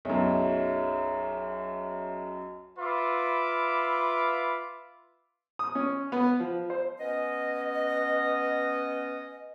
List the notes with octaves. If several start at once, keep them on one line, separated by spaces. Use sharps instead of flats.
B1 F#2 G#4 C#5 E5
F4 B4 E5 B5 D6
D#6
C#4
B3
F3
C5
B3 C#4 D#5